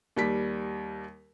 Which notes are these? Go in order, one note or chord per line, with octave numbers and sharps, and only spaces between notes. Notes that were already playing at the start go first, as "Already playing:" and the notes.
D#2 G3 B6